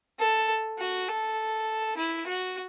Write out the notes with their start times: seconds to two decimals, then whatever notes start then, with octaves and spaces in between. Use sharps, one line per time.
0.19 A4
0.79 F#4
1.08 A4
1.97 E4
2.27 F#4